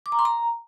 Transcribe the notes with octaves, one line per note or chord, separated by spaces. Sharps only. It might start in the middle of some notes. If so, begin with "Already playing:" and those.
D6
A#5
C6
A#5